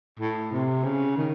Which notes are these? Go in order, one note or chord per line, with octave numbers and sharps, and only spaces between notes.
A2
C3
C#3
D#3